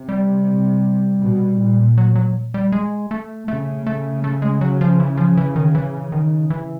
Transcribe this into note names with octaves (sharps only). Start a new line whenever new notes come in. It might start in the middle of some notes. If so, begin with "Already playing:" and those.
Already playing: C3
G3
B2
A#2
F#3
F#3
G3
G#3
A3
C#3 A3
A3
A3
G#3
F#3
F3
E3
F3
E3
D#3
E3
D#3
E3